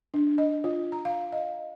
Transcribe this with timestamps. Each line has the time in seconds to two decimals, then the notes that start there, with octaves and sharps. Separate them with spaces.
0.14 D4
0.38 D#5
0.64 F4
0.92 A#5
1.05 F5
1.32 D#5